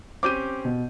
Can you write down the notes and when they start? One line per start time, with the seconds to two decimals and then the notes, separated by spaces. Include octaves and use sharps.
0.23 C4 C#4 G4 D6 G6 D#7
0.65 B2